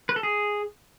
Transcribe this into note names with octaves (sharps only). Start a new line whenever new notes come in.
B4
A4
G#4